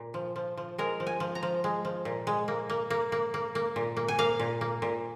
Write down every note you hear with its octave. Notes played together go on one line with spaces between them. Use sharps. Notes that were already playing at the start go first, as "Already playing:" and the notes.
Already playing: A#2
F3
F3
F3
G#3 A#4
F3
G#5
F3
A#5
F3
G#3
F3
A#2
G#3
A#3
A#3
A#3
A#3
A#3
A#3
A#2
A#3
G#5
A#3 F5
A#2
A#3
A#2